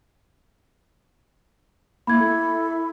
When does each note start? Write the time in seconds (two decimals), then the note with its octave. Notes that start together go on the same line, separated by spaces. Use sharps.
2.07 A#3 E4 B5 G#6
2.21 A4